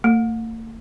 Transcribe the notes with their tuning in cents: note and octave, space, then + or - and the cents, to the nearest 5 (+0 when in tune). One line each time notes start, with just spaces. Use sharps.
A3 +45